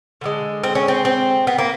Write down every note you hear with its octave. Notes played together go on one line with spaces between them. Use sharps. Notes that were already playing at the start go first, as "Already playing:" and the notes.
D3 F3 G#3
C4
C#4
C4
C4
B3
A#3